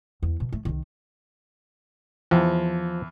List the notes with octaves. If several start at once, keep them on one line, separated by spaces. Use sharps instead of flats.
E2
B2
A3
C2 D#3
E2 F3